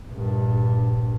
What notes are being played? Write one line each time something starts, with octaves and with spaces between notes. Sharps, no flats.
A#1 G2